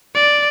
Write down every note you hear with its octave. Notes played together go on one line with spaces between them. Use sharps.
D5